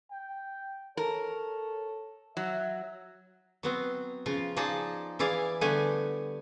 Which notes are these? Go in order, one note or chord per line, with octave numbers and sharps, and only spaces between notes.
G5
A4 A#4 C#5
F#3 E5
F#3 B3 C4
C#3 F3 F4
F3 D#4 G#4 D5 A5
E3 E4 G#4 D5 F5
D3 G3 A3 B3 G4 G#5